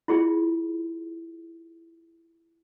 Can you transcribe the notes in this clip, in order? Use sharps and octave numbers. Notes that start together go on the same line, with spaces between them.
E4 F4 G#4